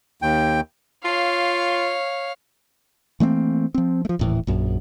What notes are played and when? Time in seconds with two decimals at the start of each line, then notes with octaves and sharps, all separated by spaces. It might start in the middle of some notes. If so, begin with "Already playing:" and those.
0.22 D#2 G5
1.05 F4 C#5 F5
3.20 E3 A3 A#3 C4
3.74 F3 C4
4.05 F3 A3
4.19 D#1 A2 E3
4.47 A#1 F#2